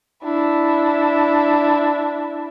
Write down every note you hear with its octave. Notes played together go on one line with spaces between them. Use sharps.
D4 E4